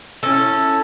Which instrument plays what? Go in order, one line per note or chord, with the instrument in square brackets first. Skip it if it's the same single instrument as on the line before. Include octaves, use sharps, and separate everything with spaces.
[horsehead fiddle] C#4 E4 [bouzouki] A4